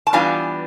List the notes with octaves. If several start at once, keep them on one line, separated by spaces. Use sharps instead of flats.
A5
E3 G3 B3 D4 F4 G#5